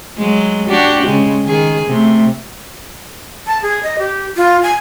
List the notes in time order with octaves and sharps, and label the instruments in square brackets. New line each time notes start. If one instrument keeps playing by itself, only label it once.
[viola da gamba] F#3 G#3
D4 F#4 G4
C#3 G#3
D#3 G#4
C3 A3
[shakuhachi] A5
G#4
D#5
G4
F4
G#5